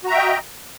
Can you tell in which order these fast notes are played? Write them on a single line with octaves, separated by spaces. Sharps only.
F#4 A#5 E5 G5 D#5